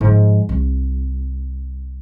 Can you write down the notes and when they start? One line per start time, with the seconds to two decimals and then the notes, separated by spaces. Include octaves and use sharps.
0.01 G#2 F3
0.49 C2